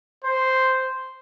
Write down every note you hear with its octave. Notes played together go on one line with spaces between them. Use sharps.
C5